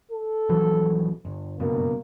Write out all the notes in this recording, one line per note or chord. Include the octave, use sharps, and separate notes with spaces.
A4
A#1 E3 F#3
G1
F#1 G2 B2 A#3